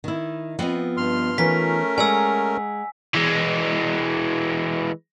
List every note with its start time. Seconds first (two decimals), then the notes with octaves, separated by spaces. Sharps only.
0.04 D#3 E4
0.59 F3 B3 C4 D#5
0.97 G2 C6 F6
1.38 E3 A3 C#4 D#4 F4 A#4 B6
1.98 G#3 G#4 D5 F#5 G#5 A#5 E6
3.14 E3 G#3